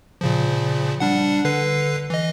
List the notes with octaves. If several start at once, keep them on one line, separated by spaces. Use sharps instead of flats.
A#2 C#3 F3
G3 D4 F#5
D3 B4 C7
E3 D#5